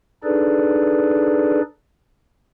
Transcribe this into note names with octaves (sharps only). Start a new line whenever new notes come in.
D4 D#4 G#4 A4 B4 D5